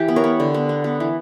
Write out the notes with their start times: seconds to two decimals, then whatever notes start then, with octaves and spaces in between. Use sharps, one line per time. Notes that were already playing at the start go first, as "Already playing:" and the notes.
Already playing: E3 G4
0.08 B3
0.16 A#4 C#5
0.24 B3
0.40 D3
0.54 B3
0.69 B3
0.84 B3
1.00 E3